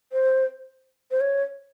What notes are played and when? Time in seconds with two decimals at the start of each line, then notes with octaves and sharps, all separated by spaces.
0.12 C5
1.11 C5
1.21 C#5